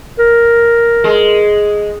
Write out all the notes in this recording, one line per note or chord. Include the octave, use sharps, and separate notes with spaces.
A#4
G#3